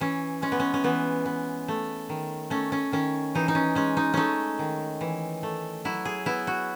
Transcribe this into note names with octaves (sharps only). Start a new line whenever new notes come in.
E3 C#4
G#3 C#4
B3
C#4
C#4
E3 B3
B3
A3
D#3
A3 C#4
C#4
D#3 C#4
E3 D#4
D#4
C#4
G#3 C#4
D#4
A3 C#4 D#4
D#3
E3
A3
F#3 E4
G#4
B3 E4
F#4